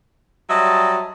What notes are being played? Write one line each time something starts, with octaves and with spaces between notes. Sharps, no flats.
F#3 G3 D#5 E5 A5 C6